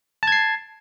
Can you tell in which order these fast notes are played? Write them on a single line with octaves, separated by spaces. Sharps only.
A5 G#6 C7